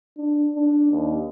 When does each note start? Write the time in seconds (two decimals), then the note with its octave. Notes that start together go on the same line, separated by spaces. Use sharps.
0.17 D4
0.55 D4
0.92 D#2